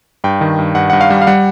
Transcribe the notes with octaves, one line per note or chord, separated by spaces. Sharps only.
G2 G5
D#3
G2
G2 F#5
G2 F#5
F5
G3
F5
G3 F#5